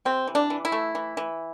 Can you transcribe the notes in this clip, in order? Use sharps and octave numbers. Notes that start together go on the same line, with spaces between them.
C3 C4
E3
D4
E3
E4
A3
E3
E3